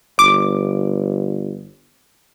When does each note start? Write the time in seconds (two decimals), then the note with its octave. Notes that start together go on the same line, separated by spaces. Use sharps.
0.19 G1 D6